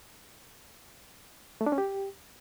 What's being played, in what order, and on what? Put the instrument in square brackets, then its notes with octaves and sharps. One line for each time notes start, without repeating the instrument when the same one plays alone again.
[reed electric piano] A3
D4
C#4
G4